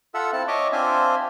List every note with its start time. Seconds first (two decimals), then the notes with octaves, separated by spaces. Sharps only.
0.14 F4 A4 E5 F#5 E6
0.33 C4 E4 A5
0.48 C#5 D#5 E5 D6
0.72 C4 D4 F4 C5 E5 G#5